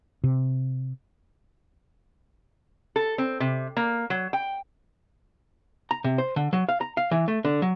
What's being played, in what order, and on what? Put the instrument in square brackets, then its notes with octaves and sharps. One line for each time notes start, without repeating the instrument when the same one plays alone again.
[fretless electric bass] C3
[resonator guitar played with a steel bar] A4
C4
C3
A#3
F#3
G5
[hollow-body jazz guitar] A#5
C3
C5
D3
F#3
F5
A#5
F5
E3
A3
D3
F#3